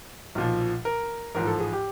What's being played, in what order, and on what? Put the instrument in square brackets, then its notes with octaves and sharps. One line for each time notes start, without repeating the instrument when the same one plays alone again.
[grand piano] B1 A#2 F3
A#4
A1 G#2 F3 A#4
A4
G#4
G4